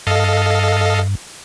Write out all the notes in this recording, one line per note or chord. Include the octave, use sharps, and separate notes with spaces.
G2 A4 D#5 F5